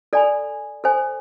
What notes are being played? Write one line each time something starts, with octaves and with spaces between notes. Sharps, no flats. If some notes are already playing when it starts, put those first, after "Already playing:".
A4 D5 G#5 B5
A4 C5 G#5